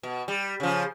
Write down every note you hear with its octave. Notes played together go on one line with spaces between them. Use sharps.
B2
G3
C#3 F3